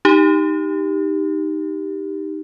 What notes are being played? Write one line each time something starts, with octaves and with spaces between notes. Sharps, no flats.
D#4 G4